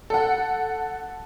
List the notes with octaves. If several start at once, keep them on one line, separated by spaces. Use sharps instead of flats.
A4 F#5